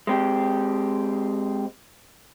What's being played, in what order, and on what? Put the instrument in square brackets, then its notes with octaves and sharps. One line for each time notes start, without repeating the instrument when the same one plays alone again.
[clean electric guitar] G#3 C4 G4